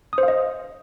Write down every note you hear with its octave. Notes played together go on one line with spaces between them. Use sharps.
D#6
C5
F5
D#5